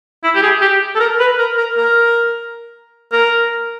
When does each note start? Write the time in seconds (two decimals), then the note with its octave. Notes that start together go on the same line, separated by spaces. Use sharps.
0.24 E4
0.35 G4
0.43 G#4
0.61 G4
0.95 A4
1.00 A#4
1.20 B4
1.38 A#4
1.58 A#4
1.77 A#4
3.13 A#4